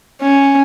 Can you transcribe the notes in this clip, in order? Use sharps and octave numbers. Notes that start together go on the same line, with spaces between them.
C#4